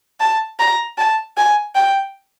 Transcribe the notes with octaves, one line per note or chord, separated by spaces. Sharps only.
A5
A#5
A5
G#5
G5